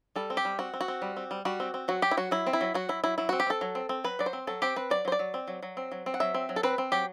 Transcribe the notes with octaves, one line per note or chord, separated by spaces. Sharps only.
G3 A4
C4
G4
G3
C4 F#4
C4
F#4
C4
G3
C4
G3
G3 F#4
C4
C4
F#3 F#4
F#3 G4
E4
F#3 F#4
F#3 E4
C4
E4
F#3
F#3 F#4
F#3 E4
F#3 E4
F#3 E4
C4 F#4
G4
C4 A4
F#3
C4
C4
F#3 B4
F#3 D5
C5
C4
F#3 A4
C4 G4
C4 B4
F#3 D5
F#3 C5
D5
F#3
C4
F#3
F#3
C4
F#3
C4
F#5
F#3 E5
C4
F#3
A4
C4 B4
C4
F#3 G4